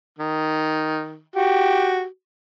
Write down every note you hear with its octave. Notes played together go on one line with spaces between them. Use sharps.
D#3
F#4 G4